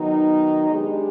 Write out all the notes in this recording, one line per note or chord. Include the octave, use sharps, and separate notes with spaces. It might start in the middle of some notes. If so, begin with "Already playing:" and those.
Already playing: D#3 F#3 B3 D#4
G#3 B3 D4 G4